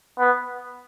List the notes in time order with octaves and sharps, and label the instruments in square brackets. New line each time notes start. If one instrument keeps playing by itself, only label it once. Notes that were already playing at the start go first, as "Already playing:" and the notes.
[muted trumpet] B3